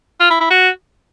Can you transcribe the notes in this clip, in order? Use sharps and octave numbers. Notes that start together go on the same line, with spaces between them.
F4
E4
E4
F#4